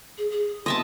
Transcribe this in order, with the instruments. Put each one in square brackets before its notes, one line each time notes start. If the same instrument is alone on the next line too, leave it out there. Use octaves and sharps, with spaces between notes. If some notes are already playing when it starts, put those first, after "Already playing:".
[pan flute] G#4
G#4
[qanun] D#5 E5 A5 [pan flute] C6